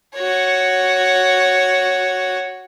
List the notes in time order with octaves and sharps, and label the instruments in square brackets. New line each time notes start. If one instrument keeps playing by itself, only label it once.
[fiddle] F#4 C#5